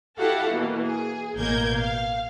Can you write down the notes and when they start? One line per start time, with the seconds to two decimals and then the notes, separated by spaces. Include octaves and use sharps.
0.18 E4 F#4 G4 A4 F5 F#5
0.53 B2 E3 A#3
0.85 G#4
1.36 A1 B2 A#3 A#4 G6 G#6
1.76 F5